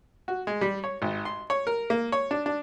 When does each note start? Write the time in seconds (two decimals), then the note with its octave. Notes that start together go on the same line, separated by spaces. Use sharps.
0.28 F#4
0.47 G#3
0.61 G3
0.84 C#5
1.02 G#1
1.25 C6
1.50 C#5
1.67 A#4
1.90 A#3
2.12 C#5
2.31 D4
2.46 D4